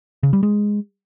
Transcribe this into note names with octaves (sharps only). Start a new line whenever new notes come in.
C#3
G3
G#3